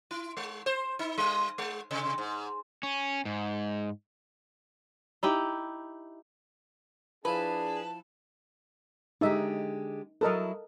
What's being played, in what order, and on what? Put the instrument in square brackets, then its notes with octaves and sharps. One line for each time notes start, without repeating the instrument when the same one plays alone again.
[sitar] E4
G#3
C5
D#4
G3
G#3
C3
G#2
[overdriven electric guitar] C#4
G#2
[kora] D#4 E4 G4
[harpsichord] F3 E4 F5 [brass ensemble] D4 G#4 [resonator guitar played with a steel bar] B4 [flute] A5
[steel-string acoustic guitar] D3 G#3 G4 [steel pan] D#4 E5
[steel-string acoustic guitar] F#3 E4 [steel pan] A4 A#4 D#5